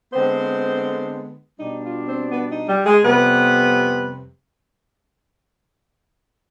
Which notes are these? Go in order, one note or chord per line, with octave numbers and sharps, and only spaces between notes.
D3 G#3 B3 C4 C5
B2 G3 D4 D#4
F4
C4 C5
B3 B4
D#4
G3 G4
G#3 G#4
F2 C3 G3 B3 B4